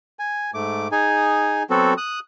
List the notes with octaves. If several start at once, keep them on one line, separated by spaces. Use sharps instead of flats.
G#5
G#2 A3 D6
D#4 G#4 G#5
F#3 B3 C4 F#4 A4
D#6 F#6